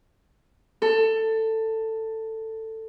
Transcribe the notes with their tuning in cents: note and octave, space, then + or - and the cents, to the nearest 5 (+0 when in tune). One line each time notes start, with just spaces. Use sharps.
A4 +15